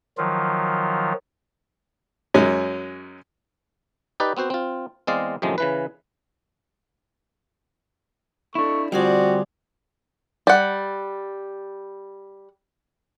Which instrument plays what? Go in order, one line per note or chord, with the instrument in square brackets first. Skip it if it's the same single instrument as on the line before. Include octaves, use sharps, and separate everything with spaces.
[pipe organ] D#3 F3 F#3 F4
[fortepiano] F#2 F#3 G#3 C#4
[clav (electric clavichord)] D#4 G4 B4 D5
B3 C4 F#4 C5
C4 F4
E2 G#3 C4 D5 D#5 F5
F#2 A2 C3 D#3 F3 G#3
C#3 E3 B4
[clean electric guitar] D4 E4 [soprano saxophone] A4 [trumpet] C#6
[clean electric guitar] D2 G3 [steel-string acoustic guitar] F3 G#4 D5 [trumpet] C4 [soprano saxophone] F#4
[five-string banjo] G3 F#5